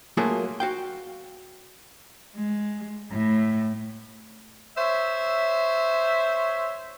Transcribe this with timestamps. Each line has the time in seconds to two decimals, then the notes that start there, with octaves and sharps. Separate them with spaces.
0.17 F#3 A3 A#3 F4 F#4 G#4
0.60 F#4 F5 G5
2.36 G#3
3.11 A2
4.77 C5 C#5 E5